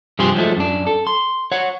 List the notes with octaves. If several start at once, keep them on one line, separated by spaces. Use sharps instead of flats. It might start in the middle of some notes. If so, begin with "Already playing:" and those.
G2 C3 F3 G4 G#4 C6
F3 F#3 G#3 A3
F#2 D4
A4
C6
C#5 F#5